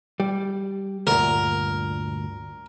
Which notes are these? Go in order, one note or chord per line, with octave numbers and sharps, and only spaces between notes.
G3
D2 G2 A#2 A#4